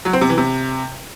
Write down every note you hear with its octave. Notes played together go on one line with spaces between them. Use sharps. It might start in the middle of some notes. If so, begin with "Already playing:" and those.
F#3
C4
C3
E3
C3